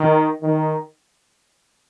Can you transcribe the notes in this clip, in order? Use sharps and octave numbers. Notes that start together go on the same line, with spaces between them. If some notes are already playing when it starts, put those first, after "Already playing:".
Already playing: D#3
D#3